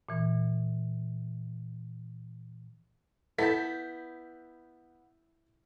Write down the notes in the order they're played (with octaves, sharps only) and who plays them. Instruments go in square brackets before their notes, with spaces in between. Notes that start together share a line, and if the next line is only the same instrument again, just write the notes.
[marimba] A#2 E3
[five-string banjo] B3 A5 [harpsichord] E4 [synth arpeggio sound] A4 [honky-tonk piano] G6 B6